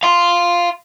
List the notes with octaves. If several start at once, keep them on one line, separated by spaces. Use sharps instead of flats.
F5 C6